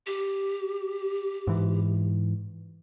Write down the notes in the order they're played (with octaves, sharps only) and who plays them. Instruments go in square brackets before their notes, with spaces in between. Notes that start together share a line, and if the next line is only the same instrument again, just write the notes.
[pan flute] G4
[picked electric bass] G#2 E3